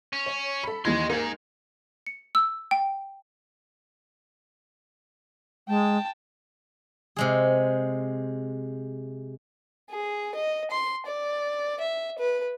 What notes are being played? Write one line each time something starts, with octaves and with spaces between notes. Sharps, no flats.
C#4
C#5
A4 B5
D#2 E3 D#5 C6 G#6
A#3 D#4 G#4 A#4
C#7
E6
G5
G#3 G5 A5
C3 G#3 G#4
G#4
D#5
C6
D5
E5
B4